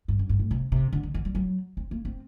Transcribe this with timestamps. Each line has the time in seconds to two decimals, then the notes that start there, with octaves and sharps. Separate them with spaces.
0.08 G2
0.19 F#2
0.29 G2
0.39 A2
0.51 C3
0.72 C3
0.92 D3
1.03 D#3
1.14 D#3
1.25 G3
1.35 F#3
1.77 C4
1.91 A#3
2.05 C4